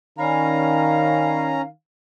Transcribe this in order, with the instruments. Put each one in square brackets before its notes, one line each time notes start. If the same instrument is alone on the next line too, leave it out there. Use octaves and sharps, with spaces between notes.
[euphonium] D#3 [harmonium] C#4 A#5 [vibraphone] D5 G#5 B5 [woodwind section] F5